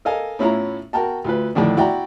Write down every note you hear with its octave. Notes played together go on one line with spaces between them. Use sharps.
A4 A#4 D#5 F5 G#5
A2 C#4 E4 F4 C#5 A#5
F#4 A#4 G5 A5
D2 F4 B4
F2 A2 D3 D#3 D4
E4 F#4 D5 G5 A#5